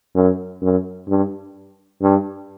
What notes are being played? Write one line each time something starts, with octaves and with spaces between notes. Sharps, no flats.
F#2
F#2
G2
G2